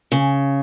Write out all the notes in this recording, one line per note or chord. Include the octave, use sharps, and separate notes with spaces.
C#3